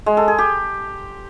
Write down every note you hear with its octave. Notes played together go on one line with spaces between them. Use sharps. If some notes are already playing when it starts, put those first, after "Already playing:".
G#3
A4
G#4
G4